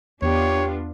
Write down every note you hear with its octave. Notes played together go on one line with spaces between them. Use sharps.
E2 B3 D4 F4 G4 C#5